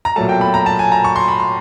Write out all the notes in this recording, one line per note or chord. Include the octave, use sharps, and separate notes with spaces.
A#5
B1 A#2 F#3 A3 A5
G5
B5
A#5
A5
G#5
A#5
C#6
C6
B5
C6